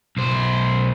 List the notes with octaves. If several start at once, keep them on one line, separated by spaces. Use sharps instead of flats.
B1 C5